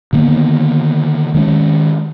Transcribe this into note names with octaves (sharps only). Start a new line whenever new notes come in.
D3 D#3 A#3 B3
D#3 G#3 C4 C#4